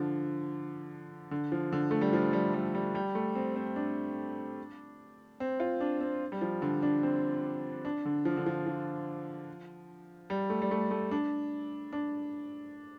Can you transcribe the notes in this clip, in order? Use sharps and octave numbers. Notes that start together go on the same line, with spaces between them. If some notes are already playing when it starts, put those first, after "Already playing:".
Already playing: D3 F3
D3
F3
D3
A3
G3
F3
G3
G3
G3
G3
A3
C4
C4
D4
C4
F4
D4
C4
G3
F3
D3
D4
C4
D4
D3
F3
D3
F3
F3
G3
A3
G3
A3
A3
D4
D4